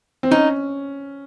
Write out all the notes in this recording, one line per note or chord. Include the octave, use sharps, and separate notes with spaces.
C4
C#4 D#4